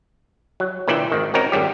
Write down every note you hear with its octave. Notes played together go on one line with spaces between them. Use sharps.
F#3
A#2 D3 E3 D5 E5 G5
G#1 D#3
C4 C#4 D#4 F#4 A#4
G#1 G#2 G3 G4